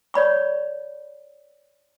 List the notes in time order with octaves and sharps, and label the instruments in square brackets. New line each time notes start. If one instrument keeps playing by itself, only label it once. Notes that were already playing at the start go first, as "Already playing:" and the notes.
[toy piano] C#5 D5 B5 C#6